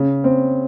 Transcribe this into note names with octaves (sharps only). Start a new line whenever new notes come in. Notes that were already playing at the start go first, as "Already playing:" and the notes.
Already playing: C#3
C4